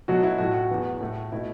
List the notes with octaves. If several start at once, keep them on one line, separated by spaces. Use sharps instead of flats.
B2 F#3 A3 F#4
E4
A2 F#3 A3 F#4
F#4
E2 E3 B3
A2 A3
B2 A3 E4